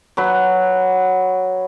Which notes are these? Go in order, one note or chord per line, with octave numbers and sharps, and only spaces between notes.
F#3 B4